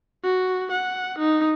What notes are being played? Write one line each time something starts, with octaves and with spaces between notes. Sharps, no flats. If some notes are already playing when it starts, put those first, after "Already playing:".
F#4
F#5
D#4